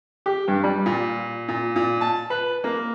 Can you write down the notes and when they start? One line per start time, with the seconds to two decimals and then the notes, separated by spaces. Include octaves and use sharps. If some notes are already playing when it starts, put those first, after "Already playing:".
0.26 G4
0.48 G2
0.64 G3
0.86 A#2
1.48 A#2
1.76 A#2
2.01 A5
2.30 B4
2.64 A#3